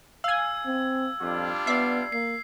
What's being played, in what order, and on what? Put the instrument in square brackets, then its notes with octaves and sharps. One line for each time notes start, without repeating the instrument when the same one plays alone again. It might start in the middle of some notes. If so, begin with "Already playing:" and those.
[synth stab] F5 G#5 [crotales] E6 G#6
[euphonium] C4
[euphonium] F2 [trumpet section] G3 D4 F4
[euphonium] B3 [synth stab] D5 E5 [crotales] C7
[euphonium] A#3 [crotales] C7